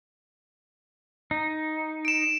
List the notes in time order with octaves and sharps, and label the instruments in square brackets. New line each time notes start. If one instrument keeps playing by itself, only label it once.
[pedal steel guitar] D#4
[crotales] D7 E7